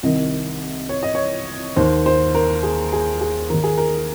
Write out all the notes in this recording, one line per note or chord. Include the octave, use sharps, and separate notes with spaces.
C2 C3 D#3 D#5
C#5
D#5
C#5
D#2 D#3 C5
C5
A#4
G#4
G#4
G#4
D#2 D#3 A#4
G#4
A#4